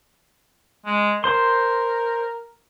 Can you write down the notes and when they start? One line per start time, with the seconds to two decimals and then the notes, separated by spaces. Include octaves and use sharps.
0.86 G#3
1.24 A#4 C5 C6